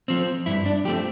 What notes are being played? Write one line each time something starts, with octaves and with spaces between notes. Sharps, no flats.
F3 C4
G2 E4
D4
F3 A3 C4 G4